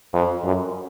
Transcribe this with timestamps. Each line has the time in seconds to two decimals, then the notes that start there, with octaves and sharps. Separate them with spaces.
0.13 F2
0.44 F#2